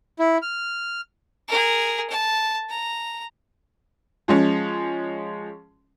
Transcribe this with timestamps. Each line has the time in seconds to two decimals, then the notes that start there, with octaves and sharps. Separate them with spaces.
0.19 E4
0.42 F6
1.48 G#4 A#4
2.10 A5
2.69 A#5
4.28 F3 G#3 C#4